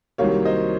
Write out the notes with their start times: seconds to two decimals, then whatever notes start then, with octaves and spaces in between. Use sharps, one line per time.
0.18 C2 C3 D#3 F#3 A#3 C#5 F5
0.45 C5 D#5